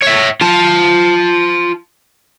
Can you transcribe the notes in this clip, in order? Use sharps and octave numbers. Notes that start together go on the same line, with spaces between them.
C#5 E5
F4 A5